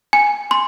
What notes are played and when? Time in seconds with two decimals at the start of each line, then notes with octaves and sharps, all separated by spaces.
0.13 G#5
0.51 C6